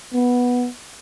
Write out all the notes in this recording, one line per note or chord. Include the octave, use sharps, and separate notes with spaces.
B3